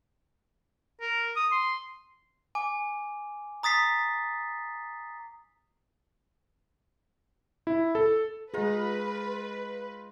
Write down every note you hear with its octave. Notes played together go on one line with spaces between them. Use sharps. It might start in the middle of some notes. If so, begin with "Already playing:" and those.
A#4
D#6
C6
G#5 D6
A#5 D#6 A6 B6 C7
E4
A4
G#3 D#4 F4 G#4 B4 A#5